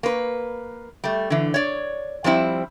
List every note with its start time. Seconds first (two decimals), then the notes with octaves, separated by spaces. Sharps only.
0.03 A#3 B4
1.04 G3 A3
1.30 D3 E3
1.54 C#5 D5
2.24 F3 G3 C4 E4